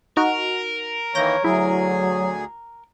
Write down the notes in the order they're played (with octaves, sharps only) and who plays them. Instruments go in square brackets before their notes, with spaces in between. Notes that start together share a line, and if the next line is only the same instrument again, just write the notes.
[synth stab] D#4 F#4 [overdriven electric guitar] A#4
[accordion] D#3 E3 A#3 [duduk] C#5 [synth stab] G6 A#6
[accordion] D2 G#4 [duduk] F#3 [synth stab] E4